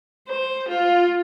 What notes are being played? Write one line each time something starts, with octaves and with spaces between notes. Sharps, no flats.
C5
F4